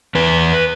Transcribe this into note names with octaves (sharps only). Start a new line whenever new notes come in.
E2 B4